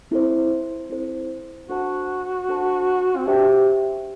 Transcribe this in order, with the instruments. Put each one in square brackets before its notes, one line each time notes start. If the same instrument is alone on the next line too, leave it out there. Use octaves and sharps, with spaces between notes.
[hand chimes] C4 E4 A4 C5
C4 E4 A4 C5
[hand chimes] D4 A4 C5 F#5 A5 [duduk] F#4
[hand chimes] D4 A4 C5 F#5 A5
[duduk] C4
[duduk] D4 [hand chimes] G4 C5 E5 G5
[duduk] D4